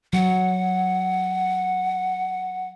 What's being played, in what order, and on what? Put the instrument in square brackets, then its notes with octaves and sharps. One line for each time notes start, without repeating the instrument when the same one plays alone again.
[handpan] F#3 [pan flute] F#5